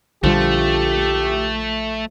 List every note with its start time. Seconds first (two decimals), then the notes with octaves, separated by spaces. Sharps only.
0.23 A#1 D3 F3 G3 A3 G4